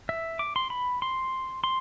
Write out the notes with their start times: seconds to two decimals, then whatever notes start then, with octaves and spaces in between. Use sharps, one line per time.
0.09 E5
0.39 D6
0.56 C6
0.70 B5
1.02 C6
1.64 C6